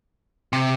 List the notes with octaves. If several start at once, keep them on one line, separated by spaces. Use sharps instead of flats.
C3